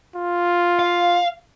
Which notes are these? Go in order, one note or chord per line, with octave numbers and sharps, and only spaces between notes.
F4
F5